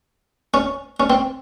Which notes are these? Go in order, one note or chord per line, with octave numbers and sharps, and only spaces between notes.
C#4
C#4
C4